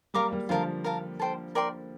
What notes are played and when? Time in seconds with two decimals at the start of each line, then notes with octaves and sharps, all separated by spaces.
0.14 G3 A#3 A#4 F5 A#5 D6
0.31 G3 A#3
0.49 D3 F3 F4 A#4 F5 A5
0.84 A#4 F5 A5
1.20 A4 C5 G5
1.55 A#4 D5 G5 C6